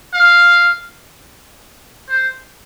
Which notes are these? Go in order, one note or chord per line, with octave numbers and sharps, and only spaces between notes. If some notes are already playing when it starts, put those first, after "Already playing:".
F5
C5